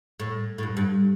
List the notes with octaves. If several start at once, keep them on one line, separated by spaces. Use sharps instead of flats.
A2
A2
G2
G2